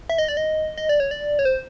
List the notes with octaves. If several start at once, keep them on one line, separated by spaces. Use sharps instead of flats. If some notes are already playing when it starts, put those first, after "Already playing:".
E5
D#5
D5
D#5
D#5
D5
C#5
D5
C#5
C5